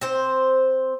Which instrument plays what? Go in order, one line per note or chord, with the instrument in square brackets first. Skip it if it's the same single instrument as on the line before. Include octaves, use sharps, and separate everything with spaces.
[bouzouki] C4 C5